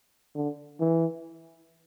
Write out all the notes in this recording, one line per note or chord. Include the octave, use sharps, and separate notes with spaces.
D3
E3